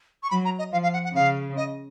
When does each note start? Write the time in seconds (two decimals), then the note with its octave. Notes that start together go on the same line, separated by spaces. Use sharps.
0.23 C#6
0.30 F#3 B5
0.45 A#5
0.59 D#5
0.72 F3 F5
0.83 F5
0.93 F#5
1.04 F#5
1.15 C#3 F5
1.57 D#5